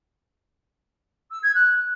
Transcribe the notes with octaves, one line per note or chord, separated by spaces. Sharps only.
E6
G#6
F#6